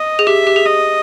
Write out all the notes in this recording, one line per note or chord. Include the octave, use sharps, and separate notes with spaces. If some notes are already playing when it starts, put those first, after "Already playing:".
Already playing: D#5
G#4
G4 E5
G4
G#4
D#5